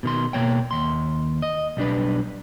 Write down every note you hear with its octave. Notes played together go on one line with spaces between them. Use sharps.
B2 D#3 C6
B2 A#3 C#5 G5
D#2 C6
D#5
B1 G3 D4 B4